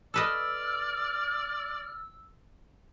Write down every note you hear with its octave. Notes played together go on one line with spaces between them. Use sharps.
A4 B4 D5 D#5 E6 F6